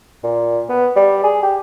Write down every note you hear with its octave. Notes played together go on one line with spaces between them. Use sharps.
A#2
B3
G3
G#4
G4